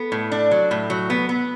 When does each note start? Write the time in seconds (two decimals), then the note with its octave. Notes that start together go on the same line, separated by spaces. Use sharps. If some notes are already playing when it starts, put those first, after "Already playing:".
Already playing: B3 A4
0.12 A2
0.32 D4
0.51 F#3
0.71 A2
0.90 F#3
1.10 B3
1.29 B3